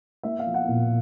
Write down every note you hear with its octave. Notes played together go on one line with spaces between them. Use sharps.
A#3 E5
F5
F3
F#5
A#2